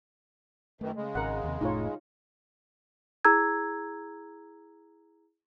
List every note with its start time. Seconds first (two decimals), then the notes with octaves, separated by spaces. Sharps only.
0.81 F#2 D#3 E3 A3
0.96 C#3 G#3
1.15 G#1 C#4 A#4 F#5
1.43 D#2 C3
1.61 F1 A2 A3 D#4 F4 C#5
3.25 E4 G#4 A#5 E6 G#6